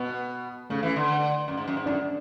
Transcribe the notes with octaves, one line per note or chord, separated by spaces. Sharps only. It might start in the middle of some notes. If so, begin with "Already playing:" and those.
Already playing: B2 B3
C#3 A3
E3
D3
F#2
G#2
F#2
G#2
F#2 D4